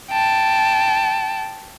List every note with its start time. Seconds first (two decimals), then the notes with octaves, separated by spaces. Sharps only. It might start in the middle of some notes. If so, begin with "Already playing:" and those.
0.11 G5 A5